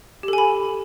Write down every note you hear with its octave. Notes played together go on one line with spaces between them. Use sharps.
G4 A4 G#5 B5